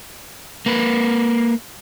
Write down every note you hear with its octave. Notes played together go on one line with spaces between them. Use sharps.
A#3 B4